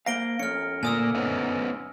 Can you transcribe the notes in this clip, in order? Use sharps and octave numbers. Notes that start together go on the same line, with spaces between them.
A#3 C5 F5 A#6 D7 G7
F2 C#4 F6 C#7
D2 A#2 A#3 G#5 D#6 E6
B3 C#4 D#4